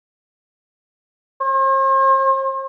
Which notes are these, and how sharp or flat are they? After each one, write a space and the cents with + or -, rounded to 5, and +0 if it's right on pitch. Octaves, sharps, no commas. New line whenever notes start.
C5 +45